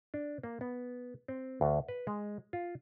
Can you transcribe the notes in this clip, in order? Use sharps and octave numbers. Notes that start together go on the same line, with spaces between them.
D4
A#3
B3
C4
D2
B4
G#3
F4